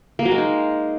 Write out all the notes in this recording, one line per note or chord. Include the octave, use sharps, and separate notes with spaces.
A#3
F#3
G#3
D#4